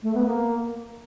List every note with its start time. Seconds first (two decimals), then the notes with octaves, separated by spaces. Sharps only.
0.03 A3
0.15 B3
0.26 A#3